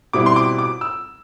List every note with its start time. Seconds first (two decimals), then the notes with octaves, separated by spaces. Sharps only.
0.13 B2 G3 C4 E4 D6
0.26 C6
0.36 D6
0.58 D6
0.81 E6